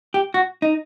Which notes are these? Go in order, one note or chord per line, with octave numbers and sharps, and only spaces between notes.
G4
F#4
D#4